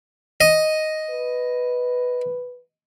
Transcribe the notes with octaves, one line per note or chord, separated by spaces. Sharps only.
D#5
B4